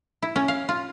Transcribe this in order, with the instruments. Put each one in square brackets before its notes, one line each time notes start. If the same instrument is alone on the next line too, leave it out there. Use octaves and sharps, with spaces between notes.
[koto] E4
C#4
F5
F4